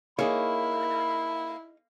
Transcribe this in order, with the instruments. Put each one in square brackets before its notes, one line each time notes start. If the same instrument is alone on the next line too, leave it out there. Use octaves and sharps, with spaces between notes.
[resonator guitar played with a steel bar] A#3 [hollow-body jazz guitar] D#4 G#4 C#5 [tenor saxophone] E4 [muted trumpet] B5